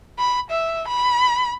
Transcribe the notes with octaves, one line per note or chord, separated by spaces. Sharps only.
B5
E5
B5